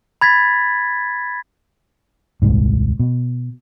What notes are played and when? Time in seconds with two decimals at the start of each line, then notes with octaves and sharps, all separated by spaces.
0.21 B5 G#6 A6 B6
2.42 D#1 C2 G#2
2.99 B2